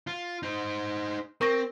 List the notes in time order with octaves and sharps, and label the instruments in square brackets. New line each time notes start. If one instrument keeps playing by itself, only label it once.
[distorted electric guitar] F4
D#4 C5
[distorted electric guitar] C4 [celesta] A#4 C#6 A#6